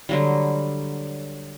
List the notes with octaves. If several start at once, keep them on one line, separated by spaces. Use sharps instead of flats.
D3 F#3 G3